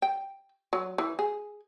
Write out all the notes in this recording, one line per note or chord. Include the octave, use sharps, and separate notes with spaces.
G5
F#3
E3
G#4